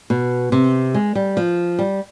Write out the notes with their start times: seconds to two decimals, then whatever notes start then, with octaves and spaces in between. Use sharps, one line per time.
0.10 B2
0.52 C3
0.94 G#3
1.15 G3
1.37 F3
1.79 G3